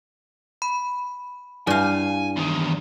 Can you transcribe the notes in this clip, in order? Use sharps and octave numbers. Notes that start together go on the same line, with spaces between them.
B5
G2 E4 D5 F5 G#5
E2 D#3